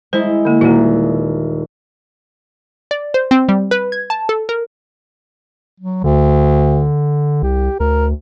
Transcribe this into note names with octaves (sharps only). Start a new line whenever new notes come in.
G#3 E4 C5
D3 A#3
D#1 A#3 F#4
D5
C5
C4
G3
B4
G#6
A5
A4
A#4
F#3
D2 D3
C2 G4
D2 A#4